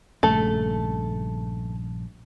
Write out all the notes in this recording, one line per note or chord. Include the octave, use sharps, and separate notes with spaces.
A#1 G2 C#3 A3 A4